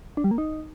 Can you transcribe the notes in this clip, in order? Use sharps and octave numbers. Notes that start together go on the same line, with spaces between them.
D4
G3
A#3
D#4